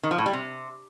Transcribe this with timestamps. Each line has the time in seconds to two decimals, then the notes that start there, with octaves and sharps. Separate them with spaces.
0.03 D#3
0.11 F3
0.18 A2
0.26 G3
0.33 C3